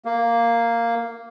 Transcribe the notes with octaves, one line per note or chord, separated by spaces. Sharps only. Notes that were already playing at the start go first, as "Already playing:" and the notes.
A#3